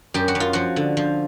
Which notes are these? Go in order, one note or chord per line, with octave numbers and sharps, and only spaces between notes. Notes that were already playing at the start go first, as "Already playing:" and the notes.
F#2 G4
F#4
F#2
F4
F3 F#4
D3
F3